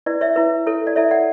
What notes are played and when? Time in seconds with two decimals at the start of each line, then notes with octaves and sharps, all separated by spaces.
0.06 E4 B4 D5
0.21 C#5 E5
0.36 E4 B4
0.66 E4 A4 C#5
0.87 D5
0.96 E4 A4 C#5 E5
1.11 D5 F#5